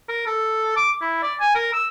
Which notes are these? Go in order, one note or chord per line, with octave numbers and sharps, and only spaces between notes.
A#4
A4
D6
E4
D5
G#5
A#4
E6